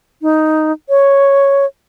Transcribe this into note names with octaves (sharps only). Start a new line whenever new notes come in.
D#4
C#5